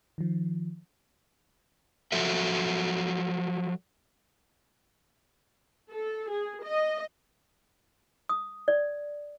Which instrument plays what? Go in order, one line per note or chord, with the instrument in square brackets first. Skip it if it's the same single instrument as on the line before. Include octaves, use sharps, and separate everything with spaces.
[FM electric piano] D#3 F3
[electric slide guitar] F3 F#3 F#4 A4 E5
[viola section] A4
G#4
D#5
[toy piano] D#6
D5